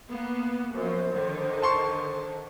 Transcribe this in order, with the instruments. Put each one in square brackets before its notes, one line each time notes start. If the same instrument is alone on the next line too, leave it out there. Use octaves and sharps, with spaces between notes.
[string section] A#3 B3
[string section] F#2 F3 [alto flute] C5
[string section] D3 D#3
[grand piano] A5 C6 C#6